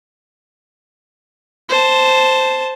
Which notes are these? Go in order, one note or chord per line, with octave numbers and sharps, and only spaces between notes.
C5 A5